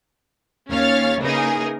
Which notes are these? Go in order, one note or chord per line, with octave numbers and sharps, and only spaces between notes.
D#2 C#4 C#5 F5 F6 A6
C#3 E3 A#3 D#4 G#4 A#4